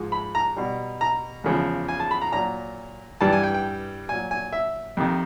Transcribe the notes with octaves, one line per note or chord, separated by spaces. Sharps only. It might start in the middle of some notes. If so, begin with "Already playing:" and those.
Already playing: G#2 F3 G#3
B5
A#5
B2 G3
A#5
E2 C#3 F3 G#3
G#5
A5
B5
A#5
A#2 F#3 A#5
G2 E3 G3 A5
G#5
G5
G5
A#2 F#3 G#5
G#5
E5
F2 C3 D#3